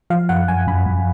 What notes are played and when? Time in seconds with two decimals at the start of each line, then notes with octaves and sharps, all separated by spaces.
0.10 F3 F5
0.29 F#2 F#5
0.48 F#2 G#5
0.67 F#2 B5
0.86 F#2